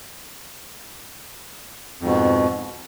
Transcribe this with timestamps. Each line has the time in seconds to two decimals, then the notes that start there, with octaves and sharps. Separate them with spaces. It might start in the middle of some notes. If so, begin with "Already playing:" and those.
2.01 F2
2.04 G#2
2.06 B2